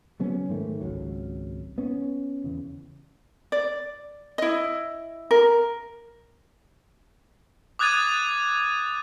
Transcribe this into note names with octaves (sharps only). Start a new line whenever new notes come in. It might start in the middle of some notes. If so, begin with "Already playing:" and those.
C#3 F#3 B3 C#4
G#2 D#3 A3
G#1 C#2 F#3
B3 C#4
E2 C#3
D5
E4 D#5
A#4
D6 D#6 F#6 G#6 A6 D#7